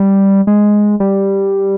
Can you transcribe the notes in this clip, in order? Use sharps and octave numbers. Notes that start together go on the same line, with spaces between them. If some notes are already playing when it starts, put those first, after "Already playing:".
Already playing: G3
G#3
G3